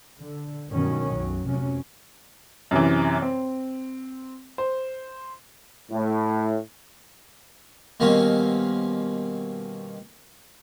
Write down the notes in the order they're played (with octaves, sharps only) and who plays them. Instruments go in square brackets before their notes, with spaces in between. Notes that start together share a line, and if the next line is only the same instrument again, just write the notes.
[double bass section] D3
G2 B2 D#3 F#3 C#4
B1 F#2 F#3
F1 C3 F#3 C#4
[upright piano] F#2 C3 E3
C4
C5
[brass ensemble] A2
[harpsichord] B2 D#3 G3 A#3 C4 C#4